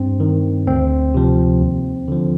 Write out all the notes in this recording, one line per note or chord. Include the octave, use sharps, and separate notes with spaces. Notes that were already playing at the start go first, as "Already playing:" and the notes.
Already playing: G2 C4
D#3
D2 C4
C3 F3
D#2
D3 F3